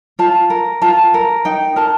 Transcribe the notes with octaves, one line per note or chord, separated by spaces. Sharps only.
F4 A5
A#4
F4 A5
A#4
D#4 G5
A#4 A5